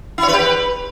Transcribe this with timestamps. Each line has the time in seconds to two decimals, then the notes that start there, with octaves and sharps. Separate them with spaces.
0.18 E4
0.23 C#5
0.28 B4
0.33 G4
0.39 B4